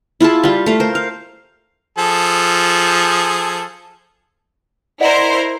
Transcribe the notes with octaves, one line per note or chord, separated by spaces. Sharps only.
E4 F4 G#4 A5
G3 F4
A3 F5
A#4 C5
F5
F3 G#4 A4
E4 A#4 C5 D5 D#5 F#5